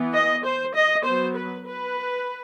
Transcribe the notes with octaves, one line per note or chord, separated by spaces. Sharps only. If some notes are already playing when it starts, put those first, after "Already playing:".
Already playing: E3 B3
D#5
C5
D#5
F#3 B3 C5
B4
B4